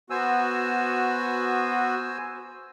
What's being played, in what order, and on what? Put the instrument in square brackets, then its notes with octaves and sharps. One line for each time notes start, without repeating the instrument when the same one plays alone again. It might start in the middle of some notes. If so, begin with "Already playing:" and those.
[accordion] B3 F#4 [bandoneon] C5 G#5 E6